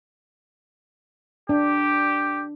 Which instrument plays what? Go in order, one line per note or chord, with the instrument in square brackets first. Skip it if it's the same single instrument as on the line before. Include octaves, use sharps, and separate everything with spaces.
[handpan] D4 [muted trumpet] G4